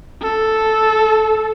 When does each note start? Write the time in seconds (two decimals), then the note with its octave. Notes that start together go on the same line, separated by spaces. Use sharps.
0.22 A4